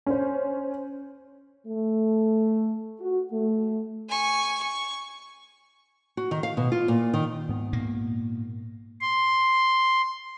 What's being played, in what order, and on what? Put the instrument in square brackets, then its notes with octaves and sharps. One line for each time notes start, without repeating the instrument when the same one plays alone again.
[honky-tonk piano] C#4 C5
[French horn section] A3
F#4
A3
[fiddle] G#5 C#6
C#6
[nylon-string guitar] F#4
D#3
F5
B2
F4
A#2
D#3
[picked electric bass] G#2 B3
[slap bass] A#2 A#3
[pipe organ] C6